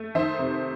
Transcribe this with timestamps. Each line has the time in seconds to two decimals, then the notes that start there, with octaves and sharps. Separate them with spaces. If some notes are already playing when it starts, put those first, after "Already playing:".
Already playing: A3
0.15 D#3 C5 E5
0.39 C3